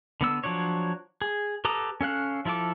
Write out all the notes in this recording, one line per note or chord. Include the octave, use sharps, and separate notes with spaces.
D3 B3 E6
F3 F#3 D4 C#5
G#4
G4 A4 B4 A#5 D#6
C#4 A4 F5 F#6
F3 E4 F4 A4 D6